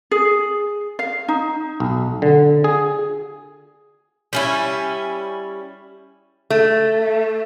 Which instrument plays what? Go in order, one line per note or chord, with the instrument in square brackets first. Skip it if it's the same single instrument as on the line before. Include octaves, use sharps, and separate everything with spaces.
[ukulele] G#4
F5
D#4
[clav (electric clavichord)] B1
D3
G#4
[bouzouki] G3 C#4 E4
[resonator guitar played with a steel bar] A3